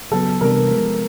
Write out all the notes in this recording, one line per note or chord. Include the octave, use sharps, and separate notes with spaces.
C#3 F#3 B3 A4
C3 E3 G3 B3 D4 A#4
F3 G#3 B3